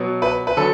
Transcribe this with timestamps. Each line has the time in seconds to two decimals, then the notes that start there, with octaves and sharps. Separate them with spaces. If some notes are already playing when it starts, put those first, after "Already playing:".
Already playing: B2 F#3 B3
0.22 B4
0.47 B4
0.57 D3 F#3 A4